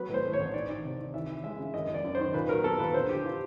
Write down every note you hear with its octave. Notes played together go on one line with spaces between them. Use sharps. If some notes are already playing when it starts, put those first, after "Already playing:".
Already playing: F#3 B3 B4
A2
C5
A2
C#5
A1
D#3 D5
D#3
C3
D#3
E3 E5
E3
G#3 E5
C#3
F#2 D#5
F#2
D5
F#2
D#3 C5
A#2 B4
F#3 A#4
B3 A4
A#2 B4
D3 C5
F3 G4
F4